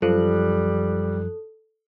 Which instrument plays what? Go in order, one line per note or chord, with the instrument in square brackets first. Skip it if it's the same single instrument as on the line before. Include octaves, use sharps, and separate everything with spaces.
[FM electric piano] F#2 F3 F#6 [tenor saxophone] G3 [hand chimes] A4